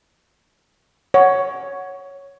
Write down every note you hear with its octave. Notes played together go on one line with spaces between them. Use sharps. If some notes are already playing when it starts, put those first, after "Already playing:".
C#5 F#5